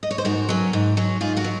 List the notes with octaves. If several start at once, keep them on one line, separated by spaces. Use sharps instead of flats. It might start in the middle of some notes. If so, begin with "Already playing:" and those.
D#5
C#5
C5
G#2 F#4 A#4
F#3 C#4
G#2
F#3 C#4
G#2 F4 G#4
F#4 A#4
F#3